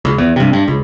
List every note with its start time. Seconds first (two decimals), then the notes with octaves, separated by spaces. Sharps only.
0.05 C#2
0.18 E2
0.36 G2 C3
0.53 G2
0.68 C#2